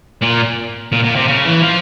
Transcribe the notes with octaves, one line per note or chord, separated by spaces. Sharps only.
A#2
A#2
A#2
C3
C#3
E3
F3